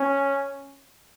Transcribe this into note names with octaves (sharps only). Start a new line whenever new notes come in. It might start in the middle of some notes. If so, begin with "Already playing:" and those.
Already playing: C#4